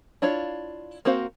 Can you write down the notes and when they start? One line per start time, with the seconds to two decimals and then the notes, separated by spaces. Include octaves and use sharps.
0.22 D4 E4 F4 C#5 F5
1.05 A#3 C4 F#4 C5 F5